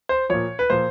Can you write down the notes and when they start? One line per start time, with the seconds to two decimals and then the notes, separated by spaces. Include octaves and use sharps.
0.09 C5
0.29 A#2 F3 C#5
0.59 B4
0.70 A#2 F3 C5